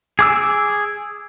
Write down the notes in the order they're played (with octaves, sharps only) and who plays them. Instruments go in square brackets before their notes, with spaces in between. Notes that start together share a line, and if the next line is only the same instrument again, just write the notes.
[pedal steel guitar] G#4 D6 E6